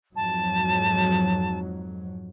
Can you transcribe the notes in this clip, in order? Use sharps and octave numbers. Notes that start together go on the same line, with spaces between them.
F2 G#2 F#3 A5